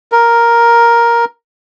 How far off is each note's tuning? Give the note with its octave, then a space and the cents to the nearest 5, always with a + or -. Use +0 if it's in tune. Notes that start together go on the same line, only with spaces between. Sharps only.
A#4 +5